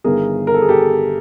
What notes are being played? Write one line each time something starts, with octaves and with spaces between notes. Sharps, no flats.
G1 G2 D#3 G#4 A#4
A#4
A4
G#4
G4 A4